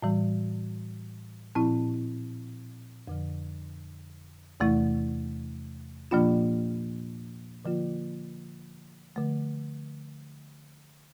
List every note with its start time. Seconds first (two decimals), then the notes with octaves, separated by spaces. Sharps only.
0.02 A2 E3 G3
1.55 A#2 F3 C4 E4
3.08 F2 D3 F3
4.60 E2 C3 E3 A3 E4
6.11 A#2 F3 A#3 D4 F4
7.65 D3 F3 A#3 F4
9.16 D3 F3 A3